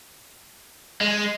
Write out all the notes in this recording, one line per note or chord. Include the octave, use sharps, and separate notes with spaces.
G#3